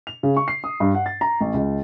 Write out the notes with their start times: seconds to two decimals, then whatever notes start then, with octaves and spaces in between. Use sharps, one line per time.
0.07 F7
0.23 C#3
0.37 C#6
0.48 C7
0.64 D#6
0.80 G2
0.95 F#5
1.06 A6
1.21 A#5
1.41 A1
1.54 C#2